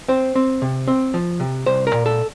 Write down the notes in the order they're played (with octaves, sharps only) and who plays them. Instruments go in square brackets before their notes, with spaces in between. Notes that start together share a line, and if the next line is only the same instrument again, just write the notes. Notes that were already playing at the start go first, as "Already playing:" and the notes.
[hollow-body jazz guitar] C4 C5
C4
C3
C4
F3
C3
C2 C5
A#4
A#2
A4